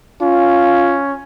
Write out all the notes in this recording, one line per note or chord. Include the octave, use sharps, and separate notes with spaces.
C#4 F4